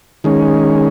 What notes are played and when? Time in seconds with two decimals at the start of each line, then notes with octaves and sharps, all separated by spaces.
0.24 D#3 G#3 C#4